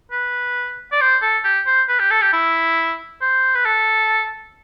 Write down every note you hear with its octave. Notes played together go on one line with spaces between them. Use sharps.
B4
D5
C5
A4
G4
C5
B4
G4
A4
G4
E4
C5
B4
A4